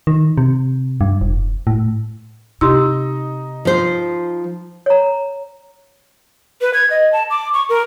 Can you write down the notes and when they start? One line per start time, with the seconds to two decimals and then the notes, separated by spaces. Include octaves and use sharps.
0.07 D#3
0.38 C3
1.01 G2
1.21 F1
1.67 A2
2.61 C3 D#4 G4 C6 E6
3.65 F3 C5
4.86 C#5 A#5
6.61 B4
6.74 G#6
6.90 D#5
7.13 A5
7.30 D6
7.54 C#6
7.69 A#4